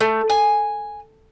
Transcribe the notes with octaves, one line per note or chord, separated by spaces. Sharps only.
A3
G#5